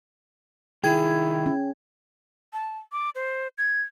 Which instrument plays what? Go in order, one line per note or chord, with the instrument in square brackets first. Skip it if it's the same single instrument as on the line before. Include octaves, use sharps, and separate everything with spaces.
[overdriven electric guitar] C2 D#3 [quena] E4 [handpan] G#4 [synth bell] G5 G#6
[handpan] C#4
[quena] A5
D6
C5
G#6